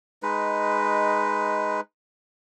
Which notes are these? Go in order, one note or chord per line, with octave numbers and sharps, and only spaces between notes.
G#3 D#4 B4